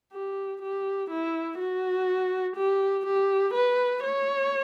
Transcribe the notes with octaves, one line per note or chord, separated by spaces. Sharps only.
G4
G4
E4
F#4
G4
G4
B4
C#5